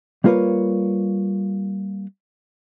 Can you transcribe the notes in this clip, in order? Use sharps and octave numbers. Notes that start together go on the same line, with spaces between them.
G3 A#3 F4 A#4 B4 C#5